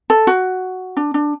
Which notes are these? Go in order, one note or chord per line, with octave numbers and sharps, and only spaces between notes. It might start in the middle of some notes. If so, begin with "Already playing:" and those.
A4
F#4
D4
D4